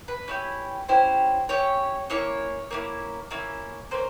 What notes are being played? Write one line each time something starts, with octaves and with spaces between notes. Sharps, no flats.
B4
C#4 E4 G4
C#4 E4 G4 C5
C#4 E4 G4 C#5
A#3 C#4 E4 C#5
A#3 C#4 E4
A#3 C#4 E4
A#3 C#4 C5